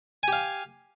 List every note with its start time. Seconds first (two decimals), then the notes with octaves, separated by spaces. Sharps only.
0.23 G#5
0.28 G4
0.33 F5